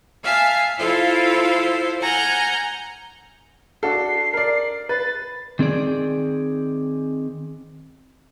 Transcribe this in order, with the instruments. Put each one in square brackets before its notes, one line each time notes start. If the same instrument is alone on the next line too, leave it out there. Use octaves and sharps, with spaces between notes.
[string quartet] E5 F5 G#5 A5
E4 F4 A4 C5 F5
F#5 G#5 A#5 F6 G6
[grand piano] D4 F#4 A4 [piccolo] C7
[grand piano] A#4 D5
[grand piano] B4 [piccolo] A6
[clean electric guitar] D#3 C4 G#4 D5